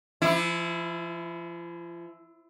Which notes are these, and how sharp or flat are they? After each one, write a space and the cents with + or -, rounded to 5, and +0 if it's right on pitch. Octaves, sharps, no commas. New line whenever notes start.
F3 -35 E4 +0